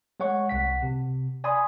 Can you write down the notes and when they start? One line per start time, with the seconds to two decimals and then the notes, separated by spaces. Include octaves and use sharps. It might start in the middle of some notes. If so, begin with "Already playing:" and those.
0.20 G#3 C#5 F#5 C#6
0.49 C2 F#5 B6
0.82 C3
1.44 D5 G#5 B5 C6 D#6